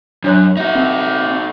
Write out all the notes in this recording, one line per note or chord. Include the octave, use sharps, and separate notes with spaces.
F#2 D4 C#5 F#6
D#4 F#4 E5
C4